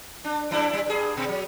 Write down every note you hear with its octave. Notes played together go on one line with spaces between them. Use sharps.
D4
F#2 D4 E4
G3 E4
G2 G#4
B2
F#3